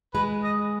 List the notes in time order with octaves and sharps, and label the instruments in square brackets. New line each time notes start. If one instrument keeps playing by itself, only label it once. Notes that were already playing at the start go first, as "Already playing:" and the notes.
[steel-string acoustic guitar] G#3 [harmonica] B4
[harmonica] D#5